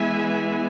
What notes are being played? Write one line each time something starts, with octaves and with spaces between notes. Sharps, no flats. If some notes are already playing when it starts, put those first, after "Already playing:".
Already playing: E3 G#3 B3 E5 G#5